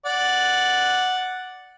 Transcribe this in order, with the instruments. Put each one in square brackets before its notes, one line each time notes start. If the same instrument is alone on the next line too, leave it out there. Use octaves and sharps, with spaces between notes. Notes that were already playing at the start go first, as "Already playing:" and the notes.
[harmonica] D5 F#5